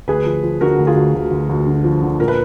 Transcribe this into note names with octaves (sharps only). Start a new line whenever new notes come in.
D2 G#4 B4
F3
F3
D3 F#4 A#4
D2
F4 G#4
D2
D2
D2
D2
D3
F3
D3
A#2 A#4
B4